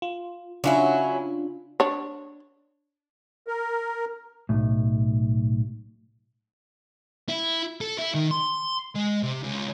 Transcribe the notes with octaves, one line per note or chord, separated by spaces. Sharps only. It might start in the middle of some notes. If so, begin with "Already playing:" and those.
F4
C#3 F#3 C#4 D4 E4 F4
D4 C#5
A#4
B1 A2
E4
A4
E4
D#3
C6
G#3
C3
C#2